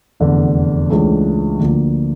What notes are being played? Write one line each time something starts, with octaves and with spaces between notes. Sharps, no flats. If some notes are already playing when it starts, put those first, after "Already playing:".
F1 E2 D3
C#2 C#3 E3 A3 D4
D2 D3 F3 A#3